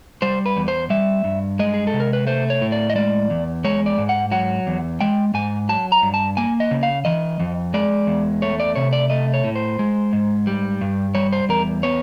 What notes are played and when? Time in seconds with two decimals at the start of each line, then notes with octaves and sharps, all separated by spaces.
0.22 G3 C5
0.46 B4
0.56 E2
0.68 C5
0.90 G3 E5
1.24 G2
1.59 G#3 D#5
1.74 G#4
1.87 A4
1.94 C3
2.00 A#4
2.13 B4
2.27 A3 C5
2.50 C#5
2.62 A2
2.72 D5
2.90 D#5
2.95 G#3 D5
3.30 E2
3.64 G#3 C#5
3.86 D5
3.98 G#2
4.09 F#5
4.32 F#3 F#5
4.67 E2
5.01 G#3 G5
5.34 G#2 G#5
5.69 F#3 A5
5.92 A#5
6.02 G2
6.14 A5
6.37 A#3 G#5
6.60 D#5
6.71 C#3
6.83 F5
7.05 E3 D#5
7.40 F2
7.74 G#3 D5
8.07 E2
8.42 A3 C#5
8.60 D5
8.76 C3 C#5
8.93 D5
9.10 A3 D#5
9.34 C#5
9.44 A2
9.56 C5
9.79 G#3
10.13 G#2
10.47 G3
10.81 G2
11.15 G3 C#5
11.33 C5
11.49 E2 A#4
11.83 B3 C#5